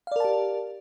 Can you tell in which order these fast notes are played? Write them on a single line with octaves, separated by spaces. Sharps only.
F5 D5 A#4 A5 G4